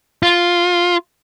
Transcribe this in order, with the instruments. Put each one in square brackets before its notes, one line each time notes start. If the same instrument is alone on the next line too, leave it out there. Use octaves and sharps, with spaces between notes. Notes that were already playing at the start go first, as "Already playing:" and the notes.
[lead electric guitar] F4